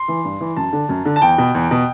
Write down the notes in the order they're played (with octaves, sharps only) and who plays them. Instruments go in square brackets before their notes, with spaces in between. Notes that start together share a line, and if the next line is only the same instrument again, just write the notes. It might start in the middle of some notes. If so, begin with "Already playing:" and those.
Already playing: [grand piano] C6
E3
G2
E3
F#2 A5
D3
F#2
D3
A5
E2 G5
B2
E2
B2